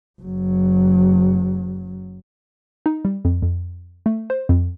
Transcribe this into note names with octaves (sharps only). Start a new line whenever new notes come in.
F#1 F#3
D#4
G3
F2
F2
A3
C5
F2